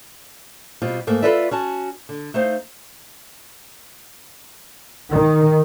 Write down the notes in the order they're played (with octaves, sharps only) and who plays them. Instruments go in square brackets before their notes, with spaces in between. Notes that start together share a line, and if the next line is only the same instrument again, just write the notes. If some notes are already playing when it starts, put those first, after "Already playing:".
[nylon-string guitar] B2 G3 C4 F4
G#2 A3 A#3
F4 G#4 A4 B4 D5 E5
C#4 F#4 A5
D3
A3 D#4 C5 F5
[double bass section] D#3